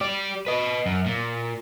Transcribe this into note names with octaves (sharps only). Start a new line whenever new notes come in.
G4 D5
B4 D#5
F#2
A#2